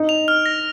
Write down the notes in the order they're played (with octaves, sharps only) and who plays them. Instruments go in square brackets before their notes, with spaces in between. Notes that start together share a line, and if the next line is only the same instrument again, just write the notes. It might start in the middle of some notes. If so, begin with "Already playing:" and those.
Already playing: [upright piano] D#4
[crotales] F7
F6
A#6